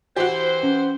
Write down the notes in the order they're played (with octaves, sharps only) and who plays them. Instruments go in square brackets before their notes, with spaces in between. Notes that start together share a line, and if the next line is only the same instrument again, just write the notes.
[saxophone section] E3 C5 [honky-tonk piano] F#4 G4
[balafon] C#4